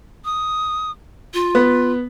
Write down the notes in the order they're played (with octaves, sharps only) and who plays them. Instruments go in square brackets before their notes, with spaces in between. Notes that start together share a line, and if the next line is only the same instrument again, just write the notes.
[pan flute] D#6
F4
[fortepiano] B3